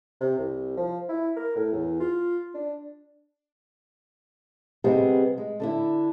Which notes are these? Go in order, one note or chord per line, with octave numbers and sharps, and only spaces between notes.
C3
C2
F3
E4
A#4
A2
E2
F4
D4
C3 G3 G#3 B3 C4 G#4
G#3
D3 D4 E4